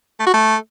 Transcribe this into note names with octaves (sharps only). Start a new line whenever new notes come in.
A3
F#4
A3